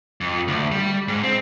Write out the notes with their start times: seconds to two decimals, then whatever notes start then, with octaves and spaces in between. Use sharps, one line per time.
0.21 F2
0.48 D2
0.72 G3
1.08 G#2
1.23 C4